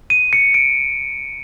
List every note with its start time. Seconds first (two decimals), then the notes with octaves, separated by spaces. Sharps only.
0.10 D#7
0.33 C#7
0.54 D7